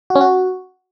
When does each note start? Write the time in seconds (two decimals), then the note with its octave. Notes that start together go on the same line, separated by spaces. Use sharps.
0.10 F#4
0.15 C#4
0.21 F#4